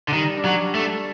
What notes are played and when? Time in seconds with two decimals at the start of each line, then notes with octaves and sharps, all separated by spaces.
0.08 D3
0.13 D#3 G3
0.37 D4
0.45 F#3
0.60 G3
0.75 A3
0.83 A4